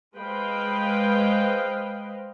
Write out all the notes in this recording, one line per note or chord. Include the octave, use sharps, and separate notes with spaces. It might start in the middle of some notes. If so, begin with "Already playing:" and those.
G#3 B4 C5 D#5 F5 G5